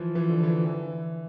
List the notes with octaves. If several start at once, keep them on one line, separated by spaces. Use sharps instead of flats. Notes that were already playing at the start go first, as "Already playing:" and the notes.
Already playing: E3 F3
E3
D3
E3
E3